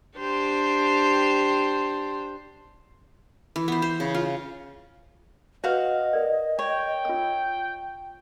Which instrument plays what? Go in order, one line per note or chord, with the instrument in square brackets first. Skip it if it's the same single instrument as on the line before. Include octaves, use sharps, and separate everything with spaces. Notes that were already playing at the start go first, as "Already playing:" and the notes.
[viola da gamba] D4 G4 C5
[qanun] E3
B3 C5
C5
C#3
F4
[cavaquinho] F#4 F5 [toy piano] B4 C#5 [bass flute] D#5
[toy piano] A#4 D5
[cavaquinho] C#5 [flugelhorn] G5
[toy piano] F4 E6